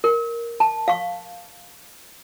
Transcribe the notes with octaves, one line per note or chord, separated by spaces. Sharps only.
A#4
A5
F5 C#6